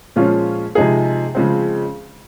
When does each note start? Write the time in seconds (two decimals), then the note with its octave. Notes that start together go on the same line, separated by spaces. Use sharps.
0.16 A#2 F3 G#3 C#4 F4
0.75 C3 F3 G#3 D#4 G#4
1.35 C#3 F3 G#3 C4